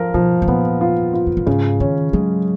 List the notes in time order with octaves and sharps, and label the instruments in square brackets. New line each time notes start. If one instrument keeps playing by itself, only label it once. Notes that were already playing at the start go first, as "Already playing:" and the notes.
Already playing: [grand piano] F3 A#4
[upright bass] B2 [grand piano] F3
[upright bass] B2
[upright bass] A#2 [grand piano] B3
[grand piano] F4
F4
[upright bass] F2
F#2
[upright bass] G#2 [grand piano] C#3
[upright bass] D#3 [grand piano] C#4
[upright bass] F#3 [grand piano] G#3